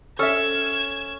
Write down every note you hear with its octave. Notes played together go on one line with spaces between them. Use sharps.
C#4 A4 E5 G#6 E7